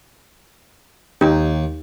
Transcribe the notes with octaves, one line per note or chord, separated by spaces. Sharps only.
D#2 D#4 G4